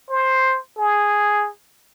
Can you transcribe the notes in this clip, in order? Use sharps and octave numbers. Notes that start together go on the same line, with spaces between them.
C5
G#4